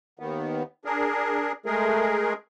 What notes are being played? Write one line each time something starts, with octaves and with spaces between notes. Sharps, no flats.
D#2 D#3 B3
D4 G#4 A#4
G#3 A3 G#4 A#4